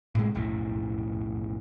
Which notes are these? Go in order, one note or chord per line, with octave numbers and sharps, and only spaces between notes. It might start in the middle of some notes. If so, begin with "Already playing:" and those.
A2 C3 G#3
F1 B1 F#2 A2